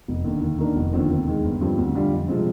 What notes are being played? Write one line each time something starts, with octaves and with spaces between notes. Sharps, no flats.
F1
D#2 D3
D#2
D#3 A#3 D4
F1
D#2 D3 F3 C4
D#2
D#3 G#3
G1
G2 F3 C4 G4
D2
D3 G3 D4 F4
F2
C3 F3 G#3 C4